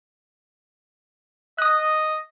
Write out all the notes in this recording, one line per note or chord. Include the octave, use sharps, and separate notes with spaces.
D#5 D#6 F#6